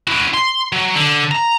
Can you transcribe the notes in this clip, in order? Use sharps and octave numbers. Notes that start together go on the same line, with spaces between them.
E4 F#4
C6
F#3
D3
A#5